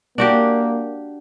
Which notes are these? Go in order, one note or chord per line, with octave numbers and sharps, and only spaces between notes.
A#3 D4 F#4 G4